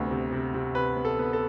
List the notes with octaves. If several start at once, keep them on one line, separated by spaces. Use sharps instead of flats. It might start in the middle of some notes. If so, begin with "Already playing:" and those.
Already playing: D2 C3 B3
C3
C3
C3
C3 B4
B3
A4
B3
A4